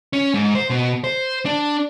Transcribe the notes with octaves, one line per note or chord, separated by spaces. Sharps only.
C#4
G#2
C5
B2
C5
D4